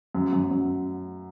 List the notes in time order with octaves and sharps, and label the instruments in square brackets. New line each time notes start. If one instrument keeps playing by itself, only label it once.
[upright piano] F#2
F#2
F#2